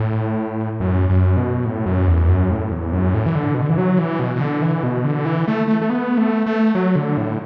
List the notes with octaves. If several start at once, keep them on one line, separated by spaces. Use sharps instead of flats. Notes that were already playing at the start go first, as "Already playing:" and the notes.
Already playing: A2
F#2
F#2
B2
A2
F#2
E2
F#2
A2
E2
F#2
A2
E3
D3
B2
D3
E3
F#3
E3
B2
B2
D3
E3
B2
D3
E3
A3
A3
A3
B3
A3
A3
F#3
D3
A2